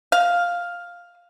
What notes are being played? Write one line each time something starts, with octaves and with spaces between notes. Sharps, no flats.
F5